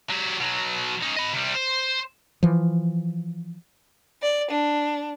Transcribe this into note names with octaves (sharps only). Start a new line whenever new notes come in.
F#3 G4
B2 F#3
C#4 D#4
D#5 B5
C3 G3
C5
E3 F3
D5
D4